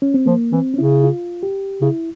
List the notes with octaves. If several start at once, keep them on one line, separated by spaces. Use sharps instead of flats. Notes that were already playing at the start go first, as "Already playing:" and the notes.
C#4
C4
F3 A#3
E3 C4
C#4
C#3 E4
F4
G4
C#3 E4